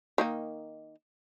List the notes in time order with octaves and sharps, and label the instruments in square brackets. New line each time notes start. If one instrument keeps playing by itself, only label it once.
[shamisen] D#3 A#3 D#4